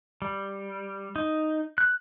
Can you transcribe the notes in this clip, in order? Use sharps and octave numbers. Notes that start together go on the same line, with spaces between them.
G3
D#4
F#6